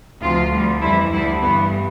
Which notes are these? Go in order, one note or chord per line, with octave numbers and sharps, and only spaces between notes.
D2 C3 F3 F4
D2 D3 G3
F2 E3 G3 E4
D2 D3 G3 E4
G2 E3 G3 B3